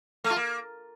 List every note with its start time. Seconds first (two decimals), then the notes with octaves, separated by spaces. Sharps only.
0.24 A3
0.30 F4
0.36 A#3